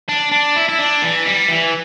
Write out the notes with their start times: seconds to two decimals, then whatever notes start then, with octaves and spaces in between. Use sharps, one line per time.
0.09 D4
0.32 D4
0.56 E4
0.69 E4
0.79 D4
1.02 E3
1.26 G3
1.48 E3